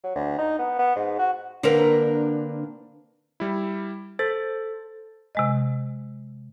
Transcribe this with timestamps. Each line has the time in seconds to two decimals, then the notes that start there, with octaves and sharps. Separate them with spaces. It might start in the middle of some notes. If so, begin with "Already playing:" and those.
0.04 F#3
0.16 D2
0.38 D#4
0.59 B3
0.79 B3
0.96 G#2
1.19 F#4
1.63 D3 A#3 C4 D4 A#4 B4
3.40 G3 E4
4.19 A4 C5 A6
5.35 C3 G#3 D#5